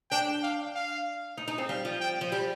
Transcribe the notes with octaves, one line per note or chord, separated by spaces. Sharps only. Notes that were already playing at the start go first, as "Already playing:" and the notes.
D4 G5
F5
F5
D#4
D#4
C4
G3 F5
F3
G5
F3
G3